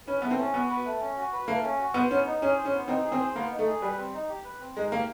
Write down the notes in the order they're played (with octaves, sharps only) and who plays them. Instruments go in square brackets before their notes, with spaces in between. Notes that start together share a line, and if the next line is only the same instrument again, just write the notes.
[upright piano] C#4 [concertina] B4
[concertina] A3 [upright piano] B3
[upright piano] C4
[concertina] C#4
[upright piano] B3 [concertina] F#4
[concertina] B4
A3
C#4
F#4
B4
[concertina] A3 [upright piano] A#3
[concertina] C#4
F#4
[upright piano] B3 [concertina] C5
[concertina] B3 [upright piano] C#4
[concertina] D#4
[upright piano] C#4 [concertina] G#4
[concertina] C5
[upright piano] C#4
[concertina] B3
[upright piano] C4 [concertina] D#4
[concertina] G#4
[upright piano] C4
[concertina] C5
[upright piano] A#3 [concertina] B3
[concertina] D#4
[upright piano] A3
[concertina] G#4
[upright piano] G3 [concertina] B4
[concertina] C4
D#4
G4
B4
C4
[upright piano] G#3 [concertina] D#4
[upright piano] A#3 [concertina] G4